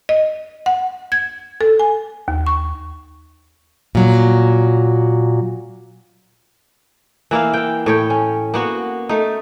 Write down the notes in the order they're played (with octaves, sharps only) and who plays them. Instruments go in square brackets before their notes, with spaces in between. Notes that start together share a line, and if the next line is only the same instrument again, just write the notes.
[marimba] D#5
F#5
G#6
A4
G#5
D#2
C#6
[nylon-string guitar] A#2 F#3
[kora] E3 A#3 E4 F5
E3 G5
A2 C#5 G5
C#4
A#3 B3 F#4
A3 D#4